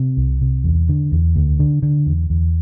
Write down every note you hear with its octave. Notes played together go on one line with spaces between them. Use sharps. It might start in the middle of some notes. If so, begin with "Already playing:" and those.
Already playing: C3
C2
C3
E2
D3
E2
D2
D3
D3
E2
E2